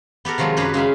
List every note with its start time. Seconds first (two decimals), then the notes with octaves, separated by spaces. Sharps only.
0.25 B3 G4 A4 A#4
0.38 C3 D#3 F3 F#3 G#3
0.57 F#2 F#3 G4 G#4 B4 A#5
0.74 C#3 G#3 E5 F5